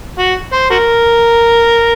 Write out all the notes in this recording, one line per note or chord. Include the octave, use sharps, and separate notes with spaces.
F#4
C5
F#4 A#4